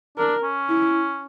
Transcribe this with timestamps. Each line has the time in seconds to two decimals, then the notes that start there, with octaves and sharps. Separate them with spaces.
0.18 D4 A#4
0.43 C#4
0.69 E4